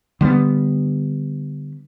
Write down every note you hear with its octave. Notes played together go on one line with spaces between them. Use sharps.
D3 G3 A3 B3